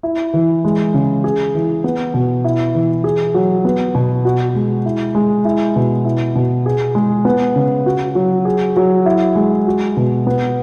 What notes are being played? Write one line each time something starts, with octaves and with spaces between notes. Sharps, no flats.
E4
E3
G#3
C#3
G#4
E3
B3
B2
E4
E3
G#4
F#3
B3
B2
F#4
G#3
E4
G#3
E4
B2
E4
B2
G#4
G#3
B3
C#3
F#4
F#3
G#4
F#3
E4
G#3
F#4
B2
B3